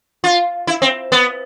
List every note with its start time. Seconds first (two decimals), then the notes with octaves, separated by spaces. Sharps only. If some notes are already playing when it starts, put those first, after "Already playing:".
0.24 F4
0.67 E4
0.82 C4
1.12 B3